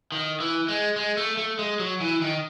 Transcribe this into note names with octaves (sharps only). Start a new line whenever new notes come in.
D#3
E3
G#3
G#3
A3
A3
G#3
F#3
E3
D#3